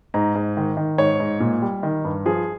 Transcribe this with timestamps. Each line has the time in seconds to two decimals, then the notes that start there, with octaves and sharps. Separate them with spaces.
0.14 G#2 A#5
0.35 G#2
0.57 D#3
0.77 D#3
0.98 G#2 C#5
1.20 G#2
1.40 A#2
1.62 G3
1.83 D#3
2.05 G2
2.26 F3 G#4